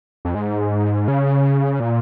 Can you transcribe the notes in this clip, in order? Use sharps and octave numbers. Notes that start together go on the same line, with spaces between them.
F2
G#2
C#3
A#2